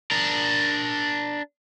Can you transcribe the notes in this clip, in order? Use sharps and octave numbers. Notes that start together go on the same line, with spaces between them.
D4 A#4